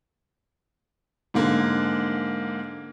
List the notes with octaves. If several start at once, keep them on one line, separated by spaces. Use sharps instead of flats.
G#2 D3 A#3